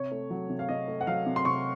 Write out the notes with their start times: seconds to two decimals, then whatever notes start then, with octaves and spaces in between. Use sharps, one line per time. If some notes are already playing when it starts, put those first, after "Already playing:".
Already playing: C3 C#5
0.11 A3
0.30 F#3
0.50 C3
0.59 F5
0.69 C3 D#5
0.88 A3
1.01 F#5
1.07 F#3 F5
1.26 C3
1.36 C6
1.45 C3 C#6